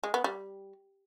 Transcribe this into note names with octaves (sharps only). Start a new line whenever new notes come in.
G#3
B3
G3